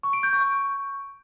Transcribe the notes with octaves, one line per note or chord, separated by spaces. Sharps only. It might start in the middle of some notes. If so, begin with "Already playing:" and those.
C#6
D7
G6
C#6